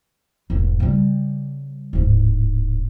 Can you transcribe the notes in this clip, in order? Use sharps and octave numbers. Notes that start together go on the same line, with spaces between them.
E1 G#2
C#3 G3
D1 G#2